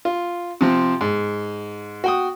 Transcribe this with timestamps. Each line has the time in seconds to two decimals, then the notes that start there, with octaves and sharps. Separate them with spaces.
0.05 F4
0.61 C3 F3 C4
1.01 G#2
2.04 F#4 G5 D#6